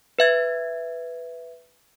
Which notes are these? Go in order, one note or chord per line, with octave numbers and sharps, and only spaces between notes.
B4 E5 G#6